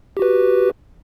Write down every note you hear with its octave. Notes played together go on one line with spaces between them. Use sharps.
F#4 G4 B4